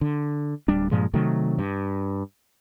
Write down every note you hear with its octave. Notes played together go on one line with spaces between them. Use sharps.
D3
D1 G3 D4
G2 A#2 F3 G#3
C3 D#3 F#3 A3
G2